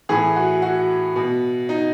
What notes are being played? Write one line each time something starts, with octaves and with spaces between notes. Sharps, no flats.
A2 E3 G#4
F#4
F#4
B2
D#4